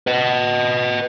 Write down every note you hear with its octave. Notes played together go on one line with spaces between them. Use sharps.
B4 D#5